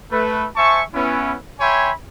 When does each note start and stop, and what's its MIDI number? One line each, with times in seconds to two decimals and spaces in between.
0.12 0.47 57
0.12 0.47 71
0.56 0.82 72
0.56 0.82 76
0.56 0.82 80
0.56 0.82 81
0.56 0.82 85
0.94 1.36 59
0.94 1.36 61
0.94 1.36 64
1.60 1.92 73
1.60 1.92 76
1.60 1.92 79
1.60 1.92 80
1.60 1.92 83
1.60 1.92 84